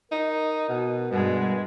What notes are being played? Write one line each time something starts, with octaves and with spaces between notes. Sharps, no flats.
D#4 A#4
B2
G2 B2 G#3